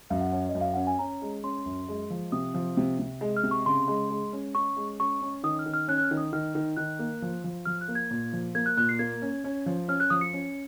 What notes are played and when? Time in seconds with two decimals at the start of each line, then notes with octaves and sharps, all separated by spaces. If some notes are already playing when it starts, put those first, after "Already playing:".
0.10 F#2 F5
0.21 F#5
0.32 C#4 F#5
0.49 D#5
0.55 F#2
0.61 F5
0.74 C#4 F#5
0.87 G#5
0.99 C#4 A#5
1.22 G#3
1.43 C#4 C6
1.66 F#2
1.88 G#3
2.10 F3
2.32 C3 D#6
2.54 F3
2.77 C3
2.99 C3
3.21 G#3
3.37 F6
3.43 C3
3.51 C#6
3.66 C#3 C6
3.88 G#3
4.10 G#3
4.33 C#4
4.55 C#4 C#6
4.77 G#3
5.00 C#4 C#6
5.21 C#4
5.43 D#3 D#6
5.59 F6
5.66 D#3
5.74 F6
5.88 C#4 F#6
5.98 F#6
6.03 F6
6.11 D#3
6.17 D#6
6.33 D#3 F6
6.55 D#3
6.77 D#3 F#6
6.99 A#3
7.22 F3
7.44 F3
7.65 F3 F6
7.81 F#6
7.88 A#3
7.95 G#6
8.11 A#2
8.33 F3
8.55 A#3 G#6
8.66 F#6
8.77 A#2 F#6
8.89 C7
8.99 A#3 G#6
9.22 C#4
9.44 C#4
9.66 F3
9.88 C#4 F6
10.00 F#6
10.10 F3 D#6
10.21 C#7
10.33 C#4